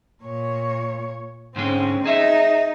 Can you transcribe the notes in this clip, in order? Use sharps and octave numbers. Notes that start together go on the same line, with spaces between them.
A#2 C#5
G#2 D3 G#3 C4 C#4
D#4 G#4 E5